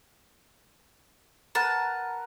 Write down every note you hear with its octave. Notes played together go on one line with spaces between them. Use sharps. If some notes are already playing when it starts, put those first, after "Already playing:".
A#4 B4 F#5 A5